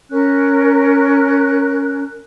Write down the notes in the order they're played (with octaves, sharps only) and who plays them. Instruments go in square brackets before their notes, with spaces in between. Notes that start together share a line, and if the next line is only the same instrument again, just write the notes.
[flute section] C#4 A#4 F#6